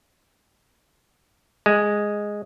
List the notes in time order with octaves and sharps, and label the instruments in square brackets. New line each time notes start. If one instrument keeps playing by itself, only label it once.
[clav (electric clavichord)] G#3